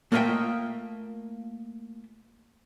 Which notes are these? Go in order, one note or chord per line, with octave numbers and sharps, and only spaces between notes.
A3 A#3 F4 D#5 E5 G5